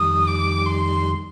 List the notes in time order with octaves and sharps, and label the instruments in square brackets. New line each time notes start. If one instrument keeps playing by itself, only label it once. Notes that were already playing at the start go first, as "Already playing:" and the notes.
Already playing: [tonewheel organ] F2 D#3 G3 [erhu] D#6
[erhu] D6
C6